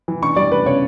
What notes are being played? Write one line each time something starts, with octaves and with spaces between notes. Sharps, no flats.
E3
D4 C#6
G3 D5
D4 B4
C#3 C#5